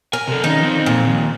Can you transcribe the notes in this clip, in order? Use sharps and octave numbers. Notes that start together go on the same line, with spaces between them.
A#4 G#5
C3 A4
D#3 C#4 D#4
F3 C4
A#2
D#2